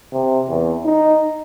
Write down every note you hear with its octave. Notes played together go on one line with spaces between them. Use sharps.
C3
E2
D#4